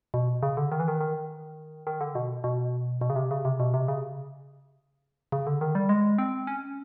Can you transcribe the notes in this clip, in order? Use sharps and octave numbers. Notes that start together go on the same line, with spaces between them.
B2
C#3
D3
D#3
E3
D#3
D#3
D#3
D3
B2
B2
B2
C#3
C3
C#3
C3
B2
C3
C#3
C#3
D3
D#3
G3
G#3
C4
C#4